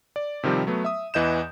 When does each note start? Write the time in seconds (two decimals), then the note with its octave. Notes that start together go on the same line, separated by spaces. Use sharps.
0.16 D5
0.43 C3 D#3 F3 G3 C4
0.67 F#3 A3 B3
0.85 E5 D#6
1.14 E2 E3 D#5 G6 E7